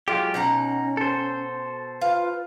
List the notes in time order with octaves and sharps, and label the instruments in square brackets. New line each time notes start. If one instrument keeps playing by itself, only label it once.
[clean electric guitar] F#3 F4 G4 [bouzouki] G#3
[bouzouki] B2 F#5 A#5 [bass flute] C#4 [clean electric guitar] D#4
[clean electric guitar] A4 C5
[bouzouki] F4 [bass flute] B4